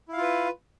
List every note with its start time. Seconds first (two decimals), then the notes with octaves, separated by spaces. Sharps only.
0.08 E4
0.13 F5
0.17 F4
0.22 B4